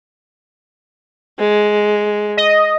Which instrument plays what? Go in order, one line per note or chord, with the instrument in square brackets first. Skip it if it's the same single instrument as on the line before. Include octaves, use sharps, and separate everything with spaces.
[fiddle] G#3
[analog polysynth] D#5